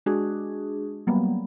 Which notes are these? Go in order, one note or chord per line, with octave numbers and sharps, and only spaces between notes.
G#3 D4 F#4 G#4
F#3 G3 A#3 B3